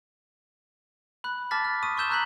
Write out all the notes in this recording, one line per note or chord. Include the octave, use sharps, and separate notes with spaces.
B5 F#6
A5 D6 F6 A6 B6
F6
C#6 D#6 D#7
C6 C#6 E6 G6 E7 G7
A#5 E6 F#6 G6 B6 F#7